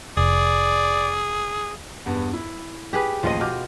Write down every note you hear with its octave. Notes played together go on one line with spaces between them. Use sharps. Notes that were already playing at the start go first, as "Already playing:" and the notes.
F1 G#4 D5
E2 G2 B3
E4
G4 G#4 B4
A1 D#2 F3 F4 D#5 D#7
B2 D6 F6 G6